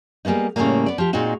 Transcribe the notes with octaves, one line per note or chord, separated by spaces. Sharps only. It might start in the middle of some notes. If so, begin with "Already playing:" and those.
G3 G#3 A#3 B3 D#4
A2 C#3 E3 F#3 G3 A#3
B3 D5
F3 G4
A#2 G#3 C4 D#4 F#4